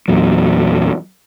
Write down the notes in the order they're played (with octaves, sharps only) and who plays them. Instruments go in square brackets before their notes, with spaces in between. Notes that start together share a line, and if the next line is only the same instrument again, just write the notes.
[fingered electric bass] E2 A#2 F#3